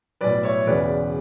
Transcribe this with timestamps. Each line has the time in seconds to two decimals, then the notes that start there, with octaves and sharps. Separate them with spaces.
0.21 B1 A2 G3 B4 D5
0.43 C#5 E5
0.66 E1 E2 C#3 B4 D5